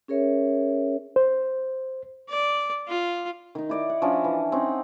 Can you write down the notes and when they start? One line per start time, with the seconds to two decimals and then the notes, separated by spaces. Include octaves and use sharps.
0.08 C#4 G#4 A#4 C#5 E5
1.16 C5
2.29 D5
2.88 F4
3.55 D#3 D#4
3.69 E4 D5 D#5
3.89 F#5
4.02 F3 C#4 D4 D#5
4.24 E3
4.52 C4 C#4 D#4 F#5